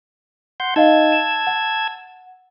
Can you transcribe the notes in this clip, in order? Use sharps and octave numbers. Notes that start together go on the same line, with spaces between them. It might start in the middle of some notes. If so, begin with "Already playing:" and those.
F#5 C6 G6
D#4 D#5 F5 A5 E6 G#6
E7
F#5